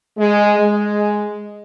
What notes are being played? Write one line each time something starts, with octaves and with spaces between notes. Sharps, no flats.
G#3
G#3